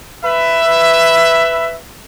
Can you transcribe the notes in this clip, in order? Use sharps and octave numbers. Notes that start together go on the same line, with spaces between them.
B4 E5